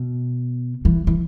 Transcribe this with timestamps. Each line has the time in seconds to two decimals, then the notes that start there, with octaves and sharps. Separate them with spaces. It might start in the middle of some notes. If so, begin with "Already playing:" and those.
Already playing: B2
0.85 E3
1.07 E3